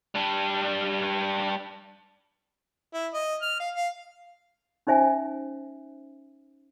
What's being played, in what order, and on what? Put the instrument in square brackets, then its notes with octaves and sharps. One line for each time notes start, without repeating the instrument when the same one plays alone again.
[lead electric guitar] G3 D4
[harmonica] E4
D#5
F6
F5
F5
[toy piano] C#4 D#4 C5 E5 G#5